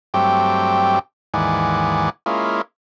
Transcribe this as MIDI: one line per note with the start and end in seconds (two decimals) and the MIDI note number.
0.14 0.99 43
0.14 0.99 54
0.14 0.99 57
0.14 0.99 60
0.14 0.99 67
0.14 0.99 79
1.34 2.10 39
1.34 2.10 44
1.34 2.10 52
1.34 2.10 74
1.34 2.10 78
1.34 2.10 80
2.26 2.62 56
2.26 2.62 58
2.26 2.62 61
2.26 2.62 64
2.26 2.62 65